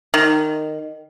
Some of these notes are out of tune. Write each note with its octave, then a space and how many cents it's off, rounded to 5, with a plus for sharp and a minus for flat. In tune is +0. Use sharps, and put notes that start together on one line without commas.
D#3 -15